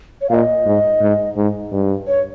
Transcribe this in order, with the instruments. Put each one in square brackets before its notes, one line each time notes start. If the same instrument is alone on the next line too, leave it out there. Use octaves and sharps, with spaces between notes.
[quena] C#5
[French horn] A#2 [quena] D#5 F5
[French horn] G#2
G#2
G#2
G2
[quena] C#5